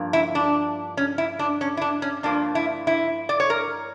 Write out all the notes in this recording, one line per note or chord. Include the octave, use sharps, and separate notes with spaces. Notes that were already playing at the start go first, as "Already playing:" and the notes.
Already playing: G2 F3 A#3
E4
D4
C#4
E4
D4
C#4
E4
D4
C#4
G2 F3 A#3 D4
E4
E4
D5
C#5
A#4